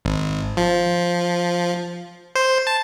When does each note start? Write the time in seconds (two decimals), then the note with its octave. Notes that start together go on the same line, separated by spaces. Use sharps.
0.05 G#1
0.57 F3
2.35 C5
2.67 A5